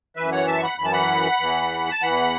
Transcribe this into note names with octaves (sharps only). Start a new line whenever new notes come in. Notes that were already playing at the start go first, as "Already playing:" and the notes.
F#2 E3 B4 E5
C#5 F#5
E5 A5
C#6
F#5 B5
F#2 E3 B5
A5
F#5 B5
E2 E3
A5
E2 E3 F#5 B5